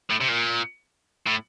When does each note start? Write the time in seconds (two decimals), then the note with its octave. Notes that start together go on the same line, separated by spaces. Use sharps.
0.10 A2
0.21 C3
0.29 A#2
1.27 A2